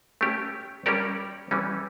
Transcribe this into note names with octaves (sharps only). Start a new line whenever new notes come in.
A3 C#4 G4
G3 C#4 G4 A#4 D5
E3 G3 C#4